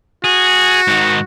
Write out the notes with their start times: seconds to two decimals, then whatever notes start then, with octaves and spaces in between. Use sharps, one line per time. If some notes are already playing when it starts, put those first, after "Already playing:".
0.24 F#4 G#4
0.87 G#2 D#3